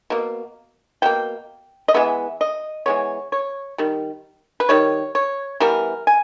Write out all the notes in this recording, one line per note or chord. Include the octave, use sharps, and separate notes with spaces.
B2 A#3
B2 A#3 G5
D#5
E3 G#3 B3 E5
D#5
E3 G#3 B3 C#5
C#5
D#3 G3
B4
D#3 G3 C#5
C#5
E3 G3 B3 A#4
G#5